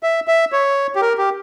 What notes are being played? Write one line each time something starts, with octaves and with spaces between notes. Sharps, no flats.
E5
E5
C#5
G4
A#4
G4